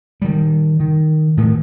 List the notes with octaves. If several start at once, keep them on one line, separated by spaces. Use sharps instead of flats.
D#3 G3
D#3
A2 D#3 E3